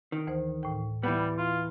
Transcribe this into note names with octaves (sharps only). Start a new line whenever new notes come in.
D#3
D2 E3 C5
A2 G5
E3 G3 B3
F4